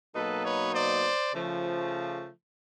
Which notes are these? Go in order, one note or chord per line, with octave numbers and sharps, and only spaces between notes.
B2 F#3 A#3 D#4 A4 B4
B4 C#5
C5 D5
C#3 F3 A3